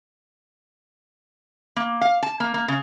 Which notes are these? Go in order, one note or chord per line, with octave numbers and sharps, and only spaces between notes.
A#3
F5
A5
A#3
A#3
C#3